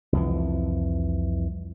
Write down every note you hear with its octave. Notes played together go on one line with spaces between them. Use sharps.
C2 F2 E3